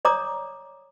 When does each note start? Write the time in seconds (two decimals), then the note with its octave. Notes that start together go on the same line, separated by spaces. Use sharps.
0.05 C#5 D5 A#5 D6 D#6